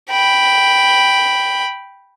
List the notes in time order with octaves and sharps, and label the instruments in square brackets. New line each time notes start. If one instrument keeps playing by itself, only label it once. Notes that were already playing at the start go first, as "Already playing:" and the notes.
[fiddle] G5 B5